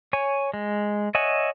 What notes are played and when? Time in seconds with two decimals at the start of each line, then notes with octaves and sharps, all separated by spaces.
0.13 C#5 G#5
0.54 G#3
1.15 C#5 D#5 E5 F#5 G#5